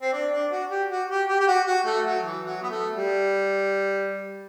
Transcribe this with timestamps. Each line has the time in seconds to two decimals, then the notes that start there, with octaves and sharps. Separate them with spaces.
0.01 C4
0.13 D4
0.32 D4
0.52 F#4
0.70 G4
0.90 F#4
1.09 G4
1.28 G4
1.40 G4
1.47 F#4
1.67 F#4
1.86 A3
2.06 F#3
2.25 E3
2.44 F#3
2.62 B3
2.70 A3
2.96 G3